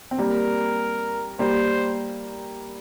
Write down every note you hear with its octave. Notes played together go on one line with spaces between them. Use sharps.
C4
G3 A#3 A#4
G3 A#3 C5